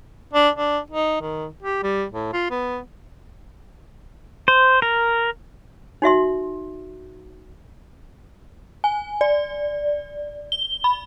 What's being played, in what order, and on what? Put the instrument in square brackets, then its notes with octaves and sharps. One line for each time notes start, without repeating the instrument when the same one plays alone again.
[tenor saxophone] D4
D4
D#4
D#3
G4
G3
A2
F4
B3
[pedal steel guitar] C5
A#4
[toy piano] D#4 F#4 E5 C6
[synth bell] G#5
D5
G7
B5